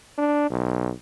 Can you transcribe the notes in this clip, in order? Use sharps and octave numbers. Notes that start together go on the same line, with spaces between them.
D4
B1